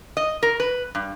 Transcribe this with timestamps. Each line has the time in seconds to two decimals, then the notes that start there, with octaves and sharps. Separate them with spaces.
0.17 D#5
0.43 A#4
0.60 B4
0.95 G2